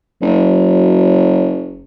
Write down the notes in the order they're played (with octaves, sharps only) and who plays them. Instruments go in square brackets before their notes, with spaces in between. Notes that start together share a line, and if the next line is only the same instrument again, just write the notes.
[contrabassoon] F#1 [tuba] F#3